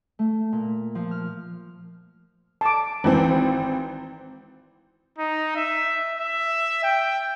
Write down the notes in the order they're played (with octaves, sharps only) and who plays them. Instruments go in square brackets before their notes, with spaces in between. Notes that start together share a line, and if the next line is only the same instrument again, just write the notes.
[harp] A3
A#2
F3
F6
[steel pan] A5 D6
[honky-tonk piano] G#1 E3 C4
[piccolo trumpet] D#4
E5
E5
G5